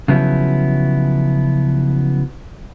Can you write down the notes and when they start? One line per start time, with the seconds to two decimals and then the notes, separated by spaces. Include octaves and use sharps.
0.08 C#3 F3 F#3 B3 E4